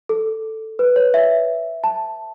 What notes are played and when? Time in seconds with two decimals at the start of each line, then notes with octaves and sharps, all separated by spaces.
0.09 A4
0.79 B4
0.96 C#5
1.14 E5
1.84 A5